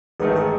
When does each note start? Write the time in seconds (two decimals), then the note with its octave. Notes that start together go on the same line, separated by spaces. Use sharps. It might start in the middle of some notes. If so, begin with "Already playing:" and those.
0.20 A1 G#2 D#3 A3 G#4 B4
0.36 G#4 B4